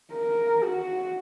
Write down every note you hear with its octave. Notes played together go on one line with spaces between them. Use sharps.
A#4
F#4